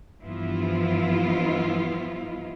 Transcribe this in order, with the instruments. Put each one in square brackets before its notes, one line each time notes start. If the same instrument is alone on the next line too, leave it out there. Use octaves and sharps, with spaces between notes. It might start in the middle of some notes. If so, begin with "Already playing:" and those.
[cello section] G2 E3 F3 B3 E4 F4